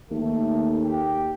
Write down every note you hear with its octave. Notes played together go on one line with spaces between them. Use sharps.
D#2 A3
G4